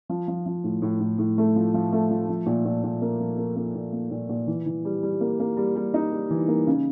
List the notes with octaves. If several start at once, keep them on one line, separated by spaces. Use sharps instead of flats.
F3
F3
F3
A2
A2
A2
A2
A3
F3
F3
A3
F3
F3
A#2
A#2
A#2
A#3
F3
A#3
A#3
A#2
A#3
A#2
A#2
E3
E3
G3
G3
A#3
A#3
G3
G3
D#4
G3
E3
A#3
C#3